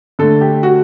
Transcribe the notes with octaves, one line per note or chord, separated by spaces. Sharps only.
D3 A3 A4
G4
F#4